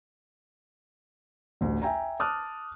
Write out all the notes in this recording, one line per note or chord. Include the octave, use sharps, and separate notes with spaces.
A1 D2
E5 G5 G#5 A#5
A5 D6 D#6 F6 F#6